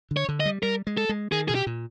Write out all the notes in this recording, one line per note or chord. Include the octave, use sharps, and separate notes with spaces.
D3
C#5
D3
D#5
G3
G3 A#4
G#3
A4
G#3
D#3 G#4
B2 G#4
G4
A#2